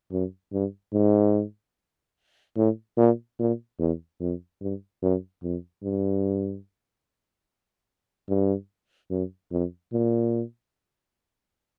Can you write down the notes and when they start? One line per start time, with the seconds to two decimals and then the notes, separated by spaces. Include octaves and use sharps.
0.12 F#2
0.53 G2
0.93 G#2
2.57 A2
2.97 A#2
3.40 A#2
3.79 E2
4.21 F2
4.61 G2
5.03 F#2
5.43 F2
5.83 G2
8.29 G2
9.11 F#2
9.51 F2
9.93 A#2